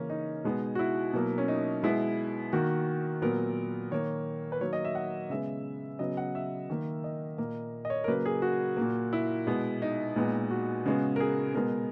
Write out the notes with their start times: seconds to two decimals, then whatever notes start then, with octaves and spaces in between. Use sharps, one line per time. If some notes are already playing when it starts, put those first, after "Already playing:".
Already playing: C#3 E3 A#3 C#4
0.10 D#4
0.44 B2 G#3 B3
0.75 F#4
0.79 E4
1.13 B2 F#3 A#3
1.38 C#4
1.48 D#4
1.83 B2 G#3 B3 E4
2.53 D#3 A#3 F#4
3.22 A#2 F#3 B3 A#4
3.91 D#3 A#3 C#5
4.52 B4
4.61 D#3 F#3 A#3 C#5
4.73 D#5
4.85 E5
4.95 F#5
5.30 C#3 G#3 B3 E5
5.99 C#3 F#3 B3 D#5
6.17 F#5
6.35 E5
6.70 D#3 A#3
7.04 D#5
7.38 A#2 A#3
7.85 D#5
7.90 C#5
8.04 A#4
8.08 C#3 F#3 A#3 B4
8.26 G#4
8.42 F#4
8.77 A#2 A#3
9.13 E4
9.47 B2 G#3 B3
9.82 D#4
10.16 A#2 G#3 B3
10.51 F#4
10.86 C#3 G#3 B3
11.16 A#4
11.20 G#4
11.54 B2 G#3 B3 A#4